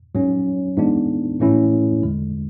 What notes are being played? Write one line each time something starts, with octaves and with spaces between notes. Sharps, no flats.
G#2 F#3 C#4
G#2 E3 B3 D4
A2 E3 A3 C#4 E4
E2 D3 G#3